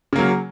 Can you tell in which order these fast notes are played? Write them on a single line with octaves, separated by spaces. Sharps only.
C#3 A#3 F#3